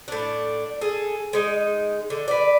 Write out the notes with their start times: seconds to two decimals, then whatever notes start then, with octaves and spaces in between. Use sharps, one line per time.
0.08 A2 D4
0.81 G#4 A4
1.33 G#3 D#4
2.10 D3
2.28 B4 D5